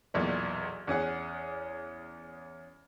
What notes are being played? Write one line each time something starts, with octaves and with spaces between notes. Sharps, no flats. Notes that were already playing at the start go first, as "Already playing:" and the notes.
B1 E2 A#2
E2 C#4 G#4 F#5